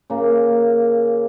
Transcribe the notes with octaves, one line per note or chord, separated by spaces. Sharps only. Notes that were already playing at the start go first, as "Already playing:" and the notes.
C#3 A#3